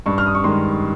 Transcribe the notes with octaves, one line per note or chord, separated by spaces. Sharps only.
G2 C#6
F6
D#6
C#6
D#3 G#3 C6